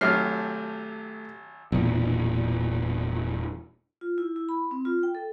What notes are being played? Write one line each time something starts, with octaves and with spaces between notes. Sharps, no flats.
G#1 F#3 A3 G4 F6 C7
E1 A#2
F4
E4
E4
B5
C4
F4
G5
A4